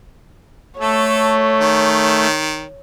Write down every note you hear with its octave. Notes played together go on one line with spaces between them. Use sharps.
A3 A4 C#5
D#3